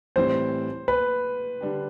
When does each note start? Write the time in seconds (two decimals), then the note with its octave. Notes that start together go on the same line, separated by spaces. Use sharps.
0.16 A2 E3 G3 C4 C5
0.88 B4
1.61 D3 G3 D4 G4